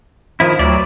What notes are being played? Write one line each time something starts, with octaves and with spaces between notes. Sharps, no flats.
D#3 F3 E4
D2 F#3 D5